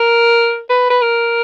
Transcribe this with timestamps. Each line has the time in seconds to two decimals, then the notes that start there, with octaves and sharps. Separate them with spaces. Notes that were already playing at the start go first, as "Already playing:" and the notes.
Already playing: A#4
0.69 B4
0.90 B4
1.01 A#4